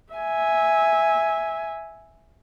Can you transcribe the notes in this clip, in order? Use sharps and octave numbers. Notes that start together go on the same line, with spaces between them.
E5 G#5